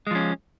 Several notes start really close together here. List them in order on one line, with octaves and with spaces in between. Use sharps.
G#3 F3 C#4